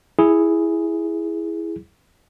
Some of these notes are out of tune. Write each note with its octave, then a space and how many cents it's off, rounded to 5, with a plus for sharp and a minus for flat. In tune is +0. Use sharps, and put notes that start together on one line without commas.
E4 +0 G#4 +0